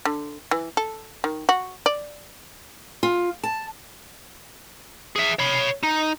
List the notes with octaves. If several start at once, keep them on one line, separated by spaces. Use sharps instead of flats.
D3
E3
A4
D#3
F#4
D5
F4
A5
G#4 E5
C#5 B5
D#4